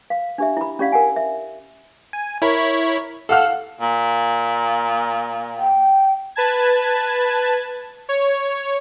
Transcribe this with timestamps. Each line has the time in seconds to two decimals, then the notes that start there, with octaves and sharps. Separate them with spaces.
0.10 F5
0.38 D4 G4 E5
0.57 E4 B5
0.79 C#4 G4 D5 F5 F#5
0.92 A#4 F#5 G#5
1.16 E5
2.13 G#5
2.42 E4 A#4 C#5 B5
3.29 A4 F5 F#5 F6
3.80 A#2
5.58 G5
6.36 B4 A5 G#6
8.09 C#5